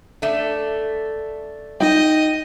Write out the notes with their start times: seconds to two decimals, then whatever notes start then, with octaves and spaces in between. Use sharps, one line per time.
0.22 A3 D4
1.80 D#4 D#5 G5